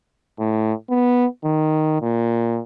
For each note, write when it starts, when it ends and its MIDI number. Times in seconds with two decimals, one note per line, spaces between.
0.39 0.73 45
0.90 1.26 59
1.44 2.01 51
2.02 2.61 46